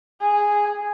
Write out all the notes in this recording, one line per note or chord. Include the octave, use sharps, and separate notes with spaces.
G#4